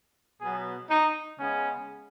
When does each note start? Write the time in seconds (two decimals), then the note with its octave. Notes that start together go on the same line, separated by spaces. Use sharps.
0.41 B2 F#3 B3 G#4
0.90 D#4
1.39 C#3 G#3 B3 C#4